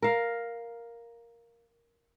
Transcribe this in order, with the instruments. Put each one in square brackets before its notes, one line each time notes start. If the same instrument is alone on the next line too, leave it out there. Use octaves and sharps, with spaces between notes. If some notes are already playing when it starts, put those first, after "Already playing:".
[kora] A#4 F5